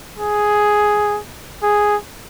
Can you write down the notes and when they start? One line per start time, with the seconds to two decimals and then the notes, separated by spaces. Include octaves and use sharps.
0.18 G#4
1.63 G#4